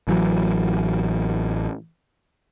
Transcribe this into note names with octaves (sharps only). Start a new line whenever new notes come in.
A1 E3 F#3